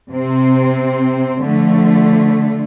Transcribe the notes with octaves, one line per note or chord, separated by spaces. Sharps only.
C3 C4
D3 F3 A3